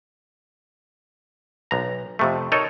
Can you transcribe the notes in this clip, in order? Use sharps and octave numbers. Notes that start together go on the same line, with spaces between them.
B1 A#5
F2 C3 A3
D#4 A4 A#4 C#5 D#5